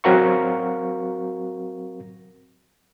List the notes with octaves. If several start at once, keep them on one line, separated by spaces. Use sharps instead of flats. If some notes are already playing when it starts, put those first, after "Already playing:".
F#3 C4 F#4 A#4 F5 C#6